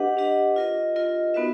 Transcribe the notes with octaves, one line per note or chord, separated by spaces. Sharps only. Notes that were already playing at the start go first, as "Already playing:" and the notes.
Already playing: D4 G4 B4 D#5 F#5
D4 G4 B4 D#5 F#5
F4 A#4 D#5
F4 A#4 D#5
B3 D#4 F#4 B4 E5